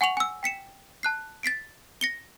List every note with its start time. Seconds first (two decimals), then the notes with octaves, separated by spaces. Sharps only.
0.01 F#5 G#5 C#6 F7 F#7
0.17 G#5 E6
0.43 G5 B6 C#7 E7
1.03 A5 F#6 C7
1.43 A6 B6 C7 D7
2.01 A#6 C#7 G7